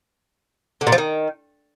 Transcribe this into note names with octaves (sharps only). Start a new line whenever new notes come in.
D3
A#2
F3
D#3